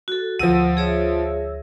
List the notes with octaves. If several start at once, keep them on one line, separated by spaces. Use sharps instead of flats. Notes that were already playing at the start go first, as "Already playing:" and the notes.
F#4 A4
D2 F3 F#5 E6 A#6 D#7
G#4 C#5 E5